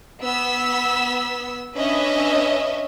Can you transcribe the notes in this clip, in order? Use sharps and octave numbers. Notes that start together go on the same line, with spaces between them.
B3 E6 B6
C#4 D4 B4 C#5 D#5 E5